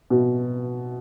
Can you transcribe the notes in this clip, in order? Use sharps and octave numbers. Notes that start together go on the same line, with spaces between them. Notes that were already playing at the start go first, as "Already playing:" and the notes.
B2